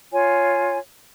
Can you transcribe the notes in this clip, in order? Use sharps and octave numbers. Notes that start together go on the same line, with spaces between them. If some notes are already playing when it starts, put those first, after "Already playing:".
F4 C#5 G#5